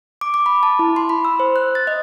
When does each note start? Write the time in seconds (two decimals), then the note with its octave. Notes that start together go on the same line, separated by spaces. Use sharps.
0.21 D6
0.34 D6
0.46 B5
0.63 A5
0.79 E4
0.96 C6
1.09 B5
1.25 E6
1.40 C5
1.56 F#6
1.75 A6
1.87 D#5